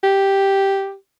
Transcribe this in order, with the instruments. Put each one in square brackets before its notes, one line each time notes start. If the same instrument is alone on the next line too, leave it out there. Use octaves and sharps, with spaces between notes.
[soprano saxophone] G4